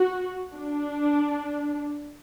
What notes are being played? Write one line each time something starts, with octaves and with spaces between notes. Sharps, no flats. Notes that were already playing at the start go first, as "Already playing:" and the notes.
Already playing: F#4
D4